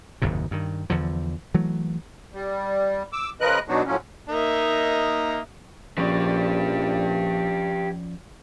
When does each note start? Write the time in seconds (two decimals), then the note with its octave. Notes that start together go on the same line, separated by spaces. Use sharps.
0.22 F#1 D#2 G#2 C3
0.51 G2 D#3
0.90 E2 D3 F3
1.54 E3 F#3 A3
2.34 G3
3.13 D6 E6
3.41 C#3 F3 A#4 B4 D#5 F#6
3.68 B2 F#3 B3 D4 D#4 F#4
3.86 A2 F3 F#3 C#4
4.29 A#3 D#4 A#4 D#5 E5
5.98 A#1 F3 C#4 G4 B4 D5